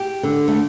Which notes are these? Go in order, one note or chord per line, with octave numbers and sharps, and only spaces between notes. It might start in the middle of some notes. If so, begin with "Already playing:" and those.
Already playing: G4
D3
A3